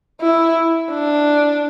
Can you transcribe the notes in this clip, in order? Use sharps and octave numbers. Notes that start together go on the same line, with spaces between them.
E4
D4